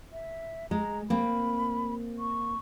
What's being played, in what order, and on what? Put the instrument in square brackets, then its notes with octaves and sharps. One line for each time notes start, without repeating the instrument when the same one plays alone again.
[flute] E5
[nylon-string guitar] G#3 [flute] A#5
[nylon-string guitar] A#3 C4 [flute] B5
[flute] C#6